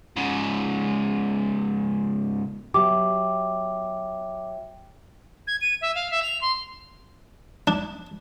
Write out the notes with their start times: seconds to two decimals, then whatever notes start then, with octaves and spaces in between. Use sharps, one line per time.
0.17 G#2 C#3
2.74 F#3 B3 G4 E5 G5 D6
5.47 G#6
5.61 D#7
5.81 E5
5.95 F5
6.10 E5
6.22 F7
6.41 C6
7.67 D4